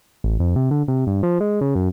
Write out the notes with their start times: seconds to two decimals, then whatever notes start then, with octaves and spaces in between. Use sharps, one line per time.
0.24 A1
0.40 F2
0.56 C3
0.71 D3
0.88 C3
1.07 G2
1.23 F3
1.40 G#3
1.61 C#3
1.75 F#2